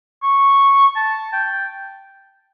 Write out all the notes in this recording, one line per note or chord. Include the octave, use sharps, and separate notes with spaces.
C#6
A5
G5